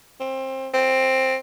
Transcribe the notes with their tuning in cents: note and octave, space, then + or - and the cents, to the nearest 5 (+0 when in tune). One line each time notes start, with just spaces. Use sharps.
C4 +25
C4 +10